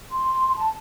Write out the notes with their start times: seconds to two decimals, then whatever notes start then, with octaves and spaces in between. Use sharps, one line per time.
0.12 C6
0.57 A5